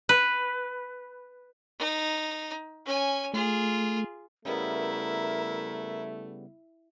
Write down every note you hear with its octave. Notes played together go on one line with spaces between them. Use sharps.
B4
D#4
C#4 G#5
A3 F4 G#4
C#3 G3 A3 B3 E4 A#4